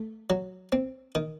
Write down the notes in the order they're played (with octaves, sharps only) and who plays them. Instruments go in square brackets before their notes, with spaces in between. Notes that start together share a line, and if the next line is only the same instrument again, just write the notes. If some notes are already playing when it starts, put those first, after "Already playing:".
Already playing: [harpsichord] A3
F#3
C4
D#3